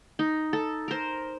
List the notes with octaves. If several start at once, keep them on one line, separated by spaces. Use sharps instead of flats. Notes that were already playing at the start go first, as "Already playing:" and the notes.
D#4
A4
A#4 C5